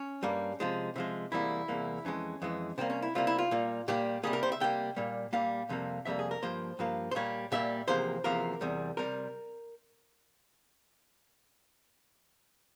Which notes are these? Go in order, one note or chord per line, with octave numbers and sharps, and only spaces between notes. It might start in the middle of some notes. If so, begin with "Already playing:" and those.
Already playing: C#4
G2 G3 A#3
C3 F3 G#3
C3 F3 G#3
E2 C3 G3 A#3 E4
E2 C3 G3 A#3
F2 E3 G#3 C#4
F2 E3 G#3
C3 G3 A#3 C4
C#4
E4
C3 G3 A#3 F4
E4
F4
A#2 G3 A#3
A#2 G3 A#3 G4
C3 G3 A#3 G#4
A#4
C5
E5
C3 G3 A#3 G5
A#2 G3 A#3
A#2 G3 A#3 F5
F2 C3 G3 A#3
F2 C3 G3 A#3 E5
G#4
A#4
G2 F3 A#3 C5
G2 F3 A#3
C5
A#2 G3 A#3 C#5
A#2 G3 A#3 E5
E2 C3 F3 A#3 C5
E2 C3 F3 A#3 A#4
E2 C3 G3
C3 G3 A#4